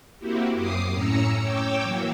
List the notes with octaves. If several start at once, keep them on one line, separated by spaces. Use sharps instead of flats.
A#3 C4 E4 F#4 G4
F#2 D6 D#6 C7
A2 C#4 A#5 E6 C#7
C#5 G5 D6 E6
E3 F#3 A#3